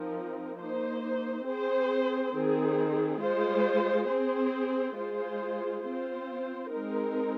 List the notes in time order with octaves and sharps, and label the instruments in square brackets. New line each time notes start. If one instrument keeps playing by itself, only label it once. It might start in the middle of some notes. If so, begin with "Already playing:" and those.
Already playing: [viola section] F3 C4 D#4 A#4
A#3 D#4 C5
C4 G#4 C5
D#3 C4 G#4
G#3 F4 C5
C4 G#4 C5
G#3 F4 G#4 C5
C4 F4 C5
G#3 C4 D#4 A#4